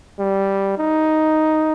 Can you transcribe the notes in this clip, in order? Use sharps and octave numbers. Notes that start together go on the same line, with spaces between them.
G3
D#4